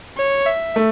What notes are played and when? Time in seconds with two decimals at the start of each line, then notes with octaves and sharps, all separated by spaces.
0.17 C#5
0.46 E5
0.76 A3